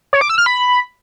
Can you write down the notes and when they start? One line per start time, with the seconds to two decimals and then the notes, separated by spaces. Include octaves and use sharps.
0.13 C#5
0.21 D6
0.30 E6
0.38 F6
0.46 B5